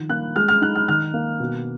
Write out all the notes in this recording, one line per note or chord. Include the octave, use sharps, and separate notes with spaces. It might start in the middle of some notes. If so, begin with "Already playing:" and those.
Already playing: D#3 F3
A#3 F#6
G#3 F6
F6
D#4 F#6
F6
D#3 F6
A#3
B2